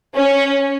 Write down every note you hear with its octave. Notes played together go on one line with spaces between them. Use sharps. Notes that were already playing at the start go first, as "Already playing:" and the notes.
C#4